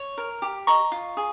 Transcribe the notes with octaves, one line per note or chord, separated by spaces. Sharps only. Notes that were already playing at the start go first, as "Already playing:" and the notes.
Already playing: C#5
A#4
G4
D#5 A#5 C#6
F4
G#4